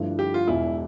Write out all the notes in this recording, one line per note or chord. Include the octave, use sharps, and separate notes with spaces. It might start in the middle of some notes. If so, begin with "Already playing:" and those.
Already playing: G2 D3 F3 A3 E4
G4
F4
E1 E2 B2 E4